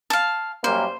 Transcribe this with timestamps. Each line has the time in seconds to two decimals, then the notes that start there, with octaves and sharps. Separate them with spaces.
0.10 F5 A5
0.64 F#2 G3 A#3 C5